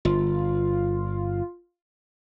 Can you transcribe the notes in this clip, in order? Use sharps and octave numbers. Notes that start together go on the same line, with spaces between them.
G1 F4